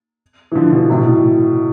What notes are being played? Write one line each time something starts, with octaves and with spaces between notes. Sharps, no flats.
E3
D3 F3
B2 D3
A2 C3
B2
A2